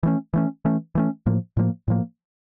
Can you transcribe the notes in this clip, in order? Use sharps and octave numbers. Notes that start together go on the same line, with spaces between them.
E3 A3 C#4
E3 A3 C#4
E3 A3 C#4
E3 A3 C#4
A2 F3 A#3
A2 F3 A#3
A2 F3 A#3